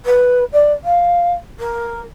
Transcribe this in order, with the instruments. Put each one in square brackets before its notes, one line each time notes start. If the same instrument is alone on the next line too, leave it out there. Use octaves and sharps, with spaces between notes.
[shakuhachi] B4
D5
F5
A#4